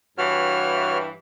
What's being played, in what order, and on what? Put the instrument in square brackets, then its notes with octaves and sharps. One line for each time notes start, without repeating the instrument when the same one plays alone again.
[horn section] G2 E3 [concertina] F#4 C#5 F6